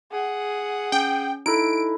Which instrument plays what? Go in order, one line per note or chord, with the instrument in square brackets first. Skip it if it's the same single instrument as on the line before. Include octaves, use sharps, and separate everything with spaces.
[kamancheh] G#4 F#5
[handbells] C#4 [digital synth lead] G5
[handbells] D#4 E4 A4 [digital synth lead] D7